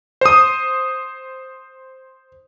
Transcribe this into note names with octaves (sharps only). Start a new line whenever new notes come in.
C5 D#6